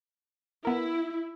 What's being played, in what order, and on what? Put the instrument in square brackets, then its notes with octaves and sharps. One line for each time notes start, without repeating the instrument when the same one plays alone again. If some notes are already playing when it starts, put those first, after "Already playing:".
[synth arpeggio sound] B3 A#4 [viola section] E4